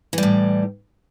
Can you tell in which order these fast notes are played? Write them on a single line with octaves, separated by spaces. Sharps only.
E3 G3 A2